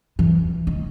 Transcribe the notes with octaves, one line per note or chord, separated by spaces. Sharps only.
E3
D#3